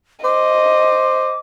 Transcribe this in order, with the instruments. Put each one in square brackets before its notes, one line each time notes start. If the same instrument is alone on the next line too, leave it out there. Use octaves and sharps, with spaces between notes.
[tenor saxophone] C5 [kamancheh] D#5 [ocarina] D6